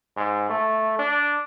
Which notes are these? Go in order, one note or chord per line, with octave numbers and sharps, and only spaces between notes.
G#2
A3
D4